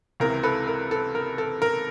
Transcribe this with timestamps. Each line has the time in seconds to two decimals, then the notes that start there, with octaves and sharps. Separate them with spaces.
0.20 C#2 C3 E3 A#4
0.43 A4 B4
0.67 A#4
0.91 A4
1.15 A#4
1.38 A4
1.62 A#4